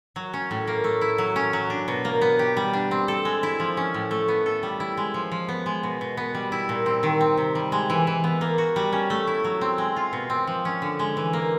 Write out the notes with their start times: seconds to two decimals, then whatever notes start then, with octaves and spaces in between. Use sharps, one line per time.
0.16 F#3
0.34 C#4
0.51 A2
0.67 A#3
0.84 A3
1.01 E4
1.18 F#3
1.36 C#4
1.53 F#3
1.70 D4
1.88 B2
2.05 A#3
2.21 B3
2.39 G4
2.57 G3
2.73 D4
2.91 C4
3.08 A4
3.25 G#3
3.43 E4
3.60 F3
3.77 C#4
3.94 A2
4.11 A3
4.28 B3
4.46 A4
4.63 G3
4.80 E4
4.97 G#3
5.14 F3
5.32 F3
5.49 B3
5.66 G#3
5.83 B2
6.01 B2
6.17 B3
6.35 G3
6.52 E4
6.69 A#2
6.86 C4
7.03 D#3
7.21 C4
7.38 C3
7.55 G3
7.72 G#3
7.90 E3
8.07 E3
8.24 B3
8.41 A#3
8.58 F#4
8.76 G3
8.93 C#4
9.10 A3
9.27 E4
9.44 F#3
9.61 C4
9.78 G#3
9.96 F4
10.13 B2
10.30 C4
10.47 F3
10.65 C#4
10.82 D3
10.99 G#3
11.17 E3
11.33 A#3